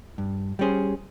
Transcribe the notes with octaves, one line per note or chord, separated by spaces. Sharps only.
G2
G3 C#4 G#4 C5